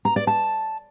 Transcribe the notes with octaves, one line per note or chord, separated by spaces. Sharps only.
A#5
D5
A5